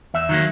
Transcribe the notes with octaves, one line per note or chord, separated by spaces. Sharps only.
E2 E5
D#3 F#3 A#3